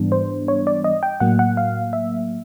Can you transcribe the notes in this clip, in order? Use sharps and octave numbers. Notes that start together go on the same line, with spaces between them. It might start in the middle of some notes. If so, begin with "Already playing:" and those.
Already playing: G#2 E3 G3 B3 D4
C5
C#5
D5
D#5
G5
A2 F#3 A#3 F#5
F#5
F5
E5